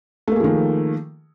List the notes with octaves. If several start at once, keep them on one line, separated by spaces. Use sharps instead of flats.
D#3 F3 A3 A#3 G#4